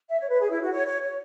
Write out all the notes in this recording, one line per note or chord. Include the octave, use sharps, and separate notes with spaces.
E5
C#5
B4
G#4
E4
F#4
C#5
C#5
C#5